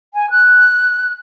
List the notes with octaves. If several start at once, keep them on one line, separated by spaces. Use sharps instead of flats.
G#5
F#6